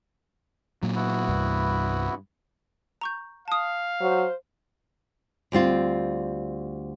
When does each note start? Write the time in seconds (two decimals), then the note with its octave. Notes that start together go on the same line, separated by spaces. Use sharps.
0.83 A#2 F#3
0.96 B3 E4 F#4
1.28 C2 G2
3.01 A#5 C#6 G6
3.48 F5 A5 D#6
4.01 F#3 C5
5.52 D2 G3 C4 F4